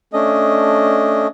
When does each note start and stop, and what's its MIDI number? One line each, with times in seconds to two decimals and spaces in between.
0.13 1.27 57
0.13 1.27 61
0.13 1.27 62
0.13 1.27 75